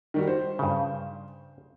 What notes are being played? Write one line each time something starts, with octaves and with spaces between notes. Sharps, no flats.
D#3 G3 F#4
C5
G2 C#3